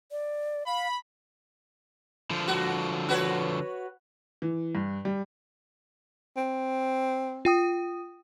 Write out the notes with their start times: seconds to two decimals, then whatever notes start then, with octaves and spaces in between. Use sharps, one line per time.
0.11 D5
0.67 F5 B5
2.30 D3 F3
2.48 F#4
3.09 F#4 B4 C#5
4.42 E3
4.75 G2
5.05 G3
6.37 C4
7.45 F4 G5 D#6